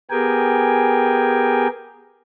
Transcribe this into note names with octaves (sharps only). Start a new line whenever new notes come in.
B3 G4 G#4 A#4 G5 G#5